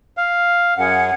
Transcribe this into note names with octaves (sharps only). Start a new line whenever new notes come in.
F5
F#2 G#4 F#5